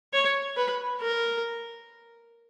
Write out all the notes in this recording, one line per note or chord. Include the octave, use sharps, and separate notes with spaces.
C#5
B4
A#4